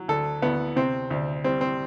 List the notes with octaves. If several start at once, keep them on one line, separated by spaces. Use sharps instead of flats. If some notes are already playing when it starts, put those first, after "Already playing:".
Already playing: F#3
D2 A4
D2 B3
C3 C4
D2
G3 C4
C4